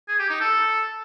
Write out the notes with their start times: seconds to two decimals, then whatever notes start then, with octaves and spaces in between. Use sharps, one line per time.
0.08 G#4
0.19 G4
0.30 D#4
0.40 A4